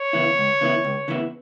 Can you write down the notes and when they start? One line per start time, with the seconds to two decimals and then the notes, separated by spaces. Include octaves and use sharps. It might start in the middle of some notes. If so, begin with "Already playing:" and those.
Already playing: C#5
0.13 C#3 E3 B3 E4
0.38 C#2
0.61 C#3 E3 B3 E4
0.84 C#2
1.08 C#3 E3 B3 E4